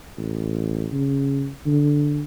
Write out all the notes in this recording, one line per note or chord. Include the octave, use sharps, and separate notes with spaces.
A1
C#3
D3